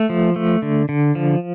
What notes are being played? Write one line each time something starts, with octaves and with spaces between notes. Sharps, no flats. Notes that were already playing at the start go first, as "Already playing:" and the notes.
Already playing: A3
F3
A3
D3
D3
F3